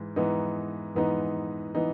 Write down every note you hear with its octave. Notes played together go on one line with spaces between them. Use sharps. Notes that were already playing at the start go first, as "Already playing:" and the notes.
Already playing: G#2 E3
G#2 E3 B3 D#4
G#2 E3 B3 D#4
E3 B3 D#4